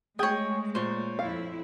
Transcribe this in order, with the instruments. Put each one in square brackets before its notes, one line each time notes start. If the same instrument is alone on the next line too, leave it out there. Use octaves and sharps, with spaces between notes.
[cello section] G#3 A3 [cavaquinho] G#4 C#5 [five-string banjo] G5 [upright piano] G6
[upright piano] A#2 [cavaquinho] C5 C#5
[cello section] F2 E4 [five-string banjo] F5